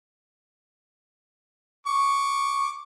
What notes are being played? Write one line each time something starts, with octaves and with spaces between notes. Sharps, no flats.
C#6 D6